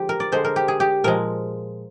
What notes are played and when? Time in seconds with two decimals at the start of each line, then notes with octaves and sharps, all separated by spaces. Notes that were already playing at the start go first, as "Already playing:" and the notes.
Already playing: D3 F3 G#3 G4
0.09 A#4
0.20 D5
0.32 D3 G#3 C5
0.45 A#4
0.56 G4
0.68 G#4
0.80 G4
1.04 A#2 F3 G#3 A#4